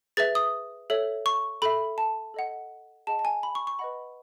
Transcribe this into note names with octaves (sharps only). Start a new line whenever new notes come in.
G#4 B4 E5 A6
D#6
A4 C#5 E5
C#6
A4 E5 B5
A5
A4 D#5 F#5
G#4 D#5 F#5 A5
A5
G#5
B5
C#6
C#6
B4 D#5 F#5 B5